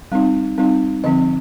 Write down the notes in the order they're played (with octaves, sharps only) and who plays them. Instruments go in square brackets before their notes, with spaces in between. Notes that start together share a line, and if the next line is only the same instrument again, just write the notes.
[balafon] G3 C4 D#4
G3 C4 D#4
D3 F3 C4 D#5